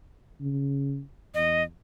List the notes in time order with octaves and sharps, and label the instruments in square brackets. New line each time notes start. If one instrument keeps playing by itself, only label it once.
[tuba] C#3
[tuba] E2 [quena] D#5